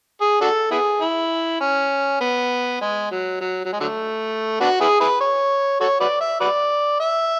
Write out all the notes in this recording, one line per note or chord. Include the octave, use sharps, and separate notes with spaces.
G#4
D4 F#4 A4
B3 E4 G#4
E4
C#4
B3
G#3
F#3
F#3
F#3
G#3
D3 F#3 A3
B3 D4 F#4
B3 E4 G#4
E4 G#4 B4
C#5
F#4 A4 C#5
F#4 B4 D5
E5
F#4 B4 D5
E5